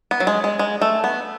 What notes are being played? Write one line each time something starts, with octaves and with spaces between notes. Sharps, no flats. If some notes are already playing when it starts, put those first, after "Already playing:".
B3
F#3
G#3
G#3
G#3
A3
B3